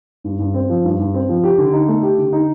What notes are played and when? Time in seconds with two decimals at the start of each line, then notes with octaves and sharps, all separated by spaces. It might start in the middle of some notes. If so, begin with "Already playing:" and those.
0.24 G2
0.39 G2
0.54 C4
0.69 F3
0.84 G2
0.99 G2
1.14 C4
1.29 F3
1.44 G4
1.58 D3
1.73 D#4
1.88 A3
2.03 G4
2.18 D3
2.33 D#4